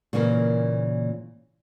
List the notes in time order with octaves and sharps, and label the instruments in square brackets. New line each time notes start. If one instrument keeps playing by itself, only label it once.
[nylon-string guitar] A#2 C#3 E3 A3 A#3